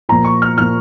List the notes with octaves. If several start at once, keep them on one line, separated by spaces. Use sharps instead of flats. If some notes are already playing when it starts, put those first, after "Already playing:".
A#2 F3 A#5
C#6
F6
A#2 F3 F6